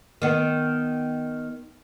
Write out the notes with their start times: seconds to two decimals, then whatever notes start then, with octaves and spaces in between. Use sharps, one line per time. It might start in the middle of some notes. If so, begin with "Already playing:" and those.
0.22 D#3 B3